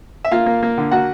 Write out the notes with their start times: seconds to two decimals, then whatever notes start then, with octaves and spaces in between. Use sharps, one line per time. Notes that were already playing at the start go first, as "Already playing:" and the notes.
0.25 E5
0.31 A#3 F4 F5
0.46 A#3
0.63 A#3
0.78 D3
0.91 A#3 F#4 F#5